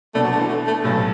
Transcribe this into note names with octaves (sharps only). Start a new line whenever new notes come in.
B2 A3 B3 D4 A4
F#3
D3
E3
A3
A3
B1 A2 F#3 A3